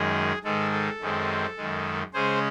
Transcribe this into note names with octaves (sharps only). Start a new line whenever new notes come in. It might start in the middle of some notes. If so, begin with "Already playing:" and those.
Already playing: F#2 D#3 G#3 G#4
G#2 D#3 G#3 A4
A4
F#2 D#3 G#3 C4
F#2 D#3 G#3
C#3 G#3 C#4 G#4 C5